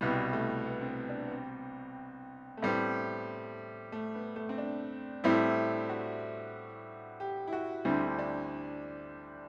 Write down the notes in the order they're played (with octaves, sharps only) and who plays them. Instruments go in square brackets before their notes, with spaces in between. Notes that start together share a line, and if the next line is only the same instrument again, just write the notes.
[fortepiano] C2 B2 G3 [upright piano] E4
[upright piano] A3
B3
C4
B3
D4
B3
C4
A3
[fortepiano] A2 G3 C4 [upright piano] B3
[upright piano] A3
B3
A3
C4
D4
[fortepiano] A2 G3 C4 E4
[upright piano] F#4
G4
E4
F#4
[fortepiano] D2 D3 G3 C4 [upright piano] E4
[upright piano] E4
D4